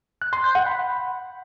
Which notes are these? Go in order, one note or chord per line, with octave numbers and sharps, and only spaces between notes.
F#6
C6
G6
F#5
B5